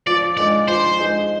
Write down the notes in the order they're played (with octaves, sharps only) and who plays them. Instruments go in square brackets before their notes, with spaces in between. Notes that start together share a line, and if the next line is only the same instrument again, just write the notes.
[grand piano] F3 [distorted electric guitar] D5
[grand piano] G#3 D#4 G#4 [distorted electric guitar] D5
[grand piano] F3 [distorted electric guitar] C5
[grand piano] G#3 D#4 G#4